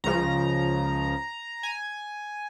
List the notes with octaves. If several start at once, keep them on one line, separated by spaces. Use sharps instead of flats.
C#2 C#3 F3 A#5
G#5